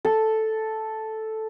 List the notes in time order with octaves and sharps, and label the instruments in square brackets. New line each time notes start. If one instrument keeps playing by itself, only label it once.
[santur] A4